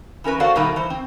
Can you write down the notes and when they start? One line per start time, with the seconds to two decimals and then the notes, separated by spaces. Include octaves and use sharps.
0.24 E3 C#4 A#4 B4
0.40 F#4 A4 C5 D5 F5 F#5
0.56 B2 D#3 G3 A3 A#3
0.76 E3 C5
0.90 C4